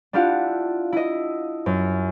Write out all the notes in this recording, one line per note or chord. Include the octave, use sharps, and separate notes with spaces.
D4 E4 F4 G4 F5 F#5
E4 D#5
F#2